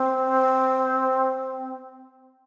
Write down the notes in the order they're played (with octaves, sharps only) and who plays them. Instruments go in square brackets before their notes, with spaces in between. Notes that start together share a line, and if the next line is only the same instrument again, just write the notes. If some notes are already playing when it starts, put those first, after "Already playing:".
Already playing: [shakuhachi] C4